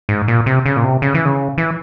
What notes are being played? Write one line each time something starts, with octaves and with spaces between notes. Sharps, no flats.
G#2
A#2
C3
C#3
A#2
C3
C#3
E3
C#3
E3